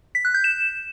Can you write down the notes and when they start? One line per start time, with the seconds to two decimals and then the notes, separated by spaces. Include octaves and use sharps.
0.15 B6
0.25 F#6
0.34 G6
0.44 E7